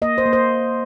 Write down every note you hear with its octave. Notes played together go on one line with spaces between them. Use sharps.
A#3 D#5
C5
A#3
C5